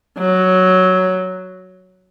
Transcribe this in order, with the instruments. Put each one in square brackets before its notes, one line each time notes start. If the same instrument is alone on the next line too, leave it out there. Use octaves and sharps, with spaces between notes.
[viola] F#3